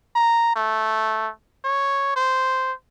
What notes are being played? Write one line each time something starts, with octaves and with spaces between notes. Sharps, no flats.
A#5
A3
C#5
C5